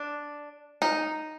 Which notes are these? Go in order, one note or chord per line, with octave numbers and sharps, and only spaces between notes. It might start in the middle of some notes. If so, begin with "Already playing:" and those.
Already playing: D4
D#4